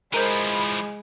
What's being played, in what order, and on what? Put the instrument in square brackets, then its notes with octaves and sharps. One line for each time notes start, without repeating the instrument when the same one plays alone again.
[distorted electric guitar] E3 F3 [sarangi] G#3 [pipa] A#4 C5 [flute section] B5